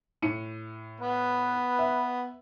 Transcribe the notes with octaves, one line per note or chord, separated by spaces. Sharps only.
A2 C#7 D#7
B3 B4
E5